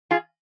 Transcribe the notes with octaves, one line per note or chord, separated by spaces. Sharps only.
F4 G#4